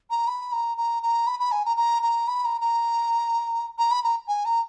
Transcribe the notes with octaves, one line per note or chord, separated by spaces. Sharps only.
A#5
B5
A#5
A#5
A#5
B5
B5
G#5
A#5
A#5
A#5
B5
A#5
A#5
A#5
B5
A#5
G#5
A#5